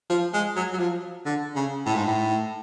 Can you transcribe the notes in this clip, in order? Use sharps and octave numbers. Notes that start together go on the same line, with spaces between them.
F3
G#3
F#3
F#3
F3
D3
C#3
A2
G#2
A2